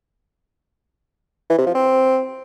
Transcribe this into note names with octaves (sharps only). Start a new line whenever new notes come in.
E3
C3
F3
C4